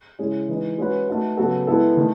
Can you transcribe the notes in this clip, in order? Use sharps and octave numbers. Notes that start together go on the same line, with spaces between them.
C#3 G#3 C#4 E4 G#4
E3 G#3 D#4
G#3 C#4 F#4 B4
A3 D#4 F#4 B4
C#3 F#3 B3 F#4 A4
G#3 B3 E4 A4
D#3 A3